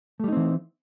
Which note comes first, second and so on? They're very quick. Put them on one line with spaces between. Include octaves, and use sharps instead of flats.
A3 G3 D#4 C4 E3